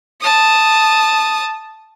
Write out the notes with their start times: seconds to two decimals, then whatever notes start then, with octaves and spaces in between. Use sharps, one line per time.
0.21 A5 D#6